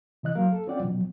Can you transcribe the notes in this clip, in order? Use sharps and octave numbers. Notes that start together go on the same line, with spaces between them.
C3 E3 D#5 F#6
F#3 A#3 A#4 F5
A4
C4 C#4 F4 D5 F#5 G5
B2 F3 F#3